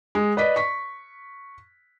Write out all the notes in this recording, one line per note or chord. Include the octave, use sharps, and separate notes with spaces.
G#3
B4 D5 D#5 B6
C#6 B6